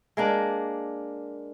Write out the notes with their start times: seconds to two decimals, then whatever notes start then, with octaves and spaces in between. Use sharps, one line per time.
0.17 G#3 A#3 D4